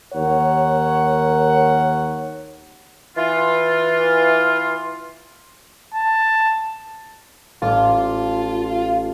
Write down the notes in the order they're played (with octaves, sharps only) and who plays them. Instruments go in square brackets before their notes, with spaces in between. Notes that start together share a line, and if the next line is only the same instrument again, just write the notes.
[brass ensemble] D#2 A#4 C#5 F#5
[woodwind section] E3 F4
[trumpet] A5
[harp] A1 A5 D6 [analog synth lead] F4